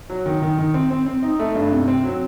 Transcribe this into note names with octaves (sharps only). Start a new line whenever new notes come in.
F#3
D#3
D#3
D#3
C4
C4
C4
D#4
A3
G2
C3
C4
F#3